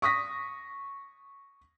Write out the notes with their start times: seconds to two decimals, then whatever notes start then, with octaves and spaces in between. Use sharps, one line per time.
0.02 C#6 D#6 A#6 B6